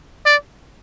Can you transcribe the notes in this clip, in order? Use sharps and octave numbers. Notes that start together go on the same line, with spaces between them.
D5